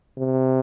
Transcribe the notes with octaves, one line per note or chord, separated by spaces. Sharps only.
C3